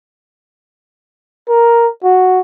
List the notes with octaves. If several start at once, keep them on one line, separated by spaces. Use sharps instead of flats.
A#4
F#4